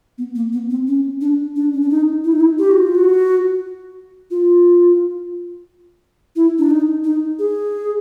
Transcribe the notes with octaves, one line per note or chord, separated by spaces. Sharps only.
B3
A#3
B3
C4
C#4
D4
D4
C#4
D4
D#4
E4
D#4
E4
G4
F#4
F4
F#4
F4
E4
D4
D#4
D#4
G#4